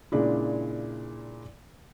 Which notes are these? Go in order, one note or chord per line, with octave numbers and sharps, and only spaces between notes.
A#2 C#3 G#3 D4 E4